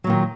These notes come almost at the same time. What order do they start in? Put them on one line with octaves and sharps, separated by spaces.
F#3 A#2 D#3